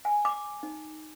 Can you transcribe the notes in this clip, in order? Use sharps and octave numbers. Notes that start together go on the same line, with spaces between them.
G#5
D6
D#4